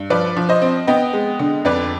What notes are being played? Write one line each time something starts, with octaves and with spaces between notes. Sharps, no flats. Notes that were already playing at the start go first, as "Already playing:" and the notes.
Already playing: G2
F3 B4 D5
F3
C5 D#5
C4
B3 D#5 G5
G#3
D3
F2 B4 D5